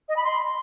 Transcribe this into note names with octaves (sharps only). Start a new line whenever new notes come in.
D#5
B5
C6